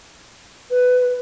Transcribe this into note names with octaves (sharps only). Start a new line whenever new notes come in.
B4